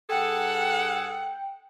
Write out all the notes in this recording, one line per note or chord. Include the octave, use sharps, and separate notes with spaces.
G2 G#4 A4 F#5 G5